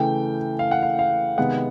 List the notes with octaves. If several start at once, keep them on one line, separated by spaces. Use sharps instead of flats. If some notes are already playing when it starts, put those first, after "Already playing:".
Already playing: C#3 E3 A3 G5
F5
F#5
F5
F5
C3 D#3 G#3 B3 F#5